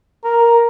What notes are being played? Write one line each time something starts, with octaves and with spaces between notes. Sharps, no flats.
A#4